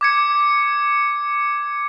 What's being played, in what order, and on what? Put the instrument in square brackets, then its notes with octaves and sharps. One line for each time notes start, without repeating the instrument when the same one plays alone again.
[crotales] D6 G#6 C#7